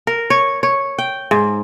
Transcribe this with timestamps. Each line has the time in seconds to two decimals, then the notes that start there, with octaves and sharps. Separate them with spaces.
0.07 A#4
0.30 C#5
0.63 C#5
0.98 G5
1.31 G#2